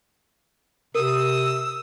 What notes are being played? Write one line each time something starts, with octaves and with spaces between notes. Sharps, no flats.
C3 A#4 D#6 E6